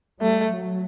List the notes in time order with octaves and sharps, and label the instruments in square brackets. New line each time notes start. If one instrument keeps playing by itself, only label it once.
[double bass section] G3 [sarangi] A3
[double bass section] F#3